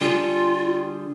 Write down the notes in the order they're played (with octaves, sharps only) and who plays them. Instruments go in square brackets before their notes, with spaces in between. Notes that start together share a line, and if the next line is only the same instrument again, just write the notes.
[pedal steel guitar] D3 G3 G#4 [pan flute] F4